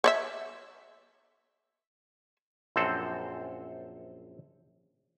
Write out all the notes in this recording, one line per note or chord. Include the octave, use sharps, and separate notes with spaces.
C#5 D5 E5
A#1 F#2 C4 A4 C5